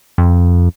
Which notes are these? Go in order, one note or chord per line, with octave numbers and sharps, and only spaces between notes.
F2